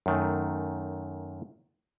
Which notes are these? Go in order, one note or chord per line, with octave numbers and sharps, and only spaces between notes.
F#2 D#3 A3